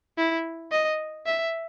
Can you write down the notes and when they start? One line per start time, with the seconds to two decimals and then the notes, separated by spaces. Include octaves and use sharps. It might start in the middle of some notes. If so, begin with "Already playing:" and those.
0.18 E4
0.71 D#5
1.26 E5